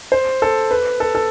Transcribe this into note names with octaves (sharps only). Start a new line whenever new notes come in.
C5
A4
B4
A4
A4